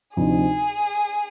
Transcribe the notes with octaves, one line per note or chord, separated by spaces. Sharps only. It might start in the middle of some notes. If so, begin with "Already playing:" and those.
D2 C3 F3 C4 D#4 G#4